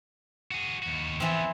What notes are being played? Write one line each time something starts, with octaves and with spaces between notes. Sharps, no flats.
F#4 G#4
D#2 F#4
E3 F3 B3 C4